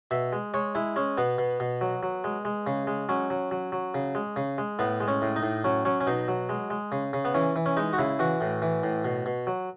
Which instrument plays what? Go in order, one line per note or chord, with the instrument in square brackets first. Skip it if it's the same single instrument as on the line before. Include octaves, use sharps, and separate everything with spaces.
[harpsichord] B2 E5
G#3
G#3 C#5
G#3 E4
G#3 C#4
B2 B3
B2
B2
F#3
F#3
G#3
G#3
C#3
G#3
F#3 C#4
F#3
F#3
F#3
C#3
G#3
C#3
G#3
A2 B3
G#3
C#4
A2
D#4
A2
F#3 C#4
F#3 C#4
C#4
B2 D#4
F#3
G#3
G#3
C#3
C#3
B3
E3 C#4
E3
C#4
G#3 D#4
F#4
C#3 E4
E3 F#4
A2
E3
A2
B2
B2
F#3